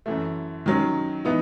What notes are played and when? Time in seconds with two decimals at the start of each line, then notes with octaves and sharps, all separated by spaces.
0.06 F#2 E3 A3
0.66 D#3 F#3 C#4
1.25 E3 B3 D#4